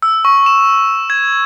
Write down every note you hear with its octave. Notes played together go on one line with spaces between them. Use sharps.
E6
C#6
E7
G#6